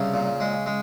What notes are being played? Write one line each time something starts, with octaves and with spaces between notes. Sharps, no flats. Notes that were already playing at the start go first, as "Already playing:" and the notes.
Already playing: C2 C#3 C#4
A#2
G#3
G#3